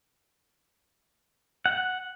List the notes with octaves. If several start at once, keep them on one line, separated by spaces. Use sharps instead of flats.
F#5